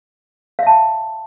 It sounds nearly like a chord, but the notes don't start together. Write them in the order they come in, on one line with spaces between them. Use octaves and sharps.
F5 E5 A5 G5